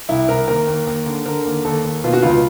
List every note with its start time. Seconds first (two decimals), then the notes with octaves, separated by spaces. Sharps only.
0.09 C2 E4
0.28 C2 A#4
0.48 D#2 A#4
0.67 D#2
0.87 D#2
1.06 D3
1.26 D3 A#4
1.45 D#2
1.65 D#2 A4
1.84 D#2
2.04 B2 F4
2.13 F#4
2.22 C#2 F4